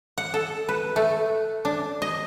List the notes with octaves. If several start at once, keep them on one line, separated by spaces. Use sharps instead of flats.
F#5
A4
B4
A3
D4
D#5